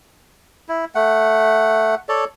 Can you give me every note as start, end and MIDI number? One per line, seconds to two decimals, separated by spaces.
0.68 0.85 64
0.95 1.95 57
0.95 1.95 78
2.09 2.25 69
2.09 2.25 73
2.09 2.25 74